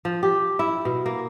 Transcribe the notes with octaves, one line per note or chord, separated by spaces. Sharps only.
F3
G4
E4
B2
A#3